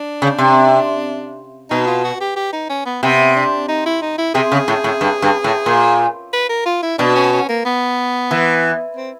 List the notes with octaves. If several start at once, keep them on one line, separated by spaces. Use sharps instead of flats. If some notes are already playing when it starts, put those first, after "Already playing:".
Already playing: D4
C#3
C3
B2 D#4
F4
F#4
G4
G4
D#4
C#4
B3
C3 B3
D4
D#4
E4
D#4
E4
C3 G#4
C#3
A2
A2
G2
G2
A2
A#2
B4
A#4
F4
E4
B2 D4
C#4
C#4
A#3
B3
E3
C4